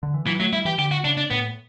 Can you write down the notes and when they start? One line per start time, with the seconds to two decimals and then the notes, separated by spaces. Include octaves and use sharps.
0.03 D3
0.14 E3
0.27 E3 F#3
0.39 F#3 A3
0.53 G3 E4
0.65 E3 G4
0.78 D3 G4
0.91 F#4
1.04 C#3 D4
1.17 D4
1.30 A2 B3